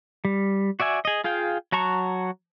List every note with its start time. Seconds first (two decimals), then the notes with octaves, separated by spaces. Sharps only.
0.25 G3
0.80 F#4 D5 E5 G#5
1.05 G#4 D#5
1.24 F4 G#4 F5 G5
1.72 F#3 F#4 A5 A#5 C#6